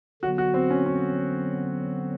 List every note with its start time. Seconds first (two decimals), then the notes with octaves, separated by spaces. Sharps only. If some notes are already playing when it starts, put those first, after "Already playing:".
0.22 D3 F#3 B3 F#4
0.38 F#4
0.54 C4
0.70 C#4
0.86 C#4